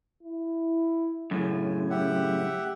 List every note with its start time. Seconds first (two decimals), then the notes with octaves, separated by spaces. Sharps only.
0.23 E4
1.31 F#2 A2 C#3 G#5
1.90 C#3 G4 E5 F#5